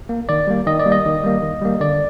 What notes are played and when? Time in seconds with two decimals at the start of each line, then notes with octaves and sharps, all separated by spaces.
0.09 A#3
0.29 D#3 D5
0.47 G3 A#3
0.67 D#3 D#5
0.79 D5
0.86 G3 A#3
0.92 D#5
1.05 D#3
1.24 G3 A#3
1.43 D#3
1.61 G3 A#3
1.80 D3 D5